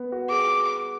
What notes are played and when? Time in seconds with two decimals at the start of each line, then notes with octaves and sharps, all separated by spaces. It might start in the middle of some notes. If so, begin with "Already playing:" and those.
Already playing: B3
0.12 F#4
0.30 G#4 D6